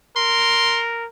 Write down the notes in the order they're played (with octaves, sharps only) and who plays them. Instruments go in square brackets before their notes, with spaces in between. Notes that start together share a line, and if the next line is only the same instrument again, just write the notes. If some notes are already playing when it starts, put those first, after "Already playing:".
[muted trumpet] A#4 [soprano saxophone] C6